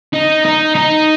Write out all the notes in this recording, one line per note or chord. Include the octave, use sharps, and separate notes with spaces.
D#4
D#4
D#4